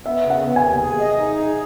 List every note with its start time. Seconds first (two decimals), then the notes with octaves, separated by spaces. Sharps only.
0.05 B3 E5
0.24 C#3
0.30 F#5
0.43 B3
0.56 G#5
0.62 D#2
0.81 G#4
1.00 D#5
1.19 D#4
1.38 G#4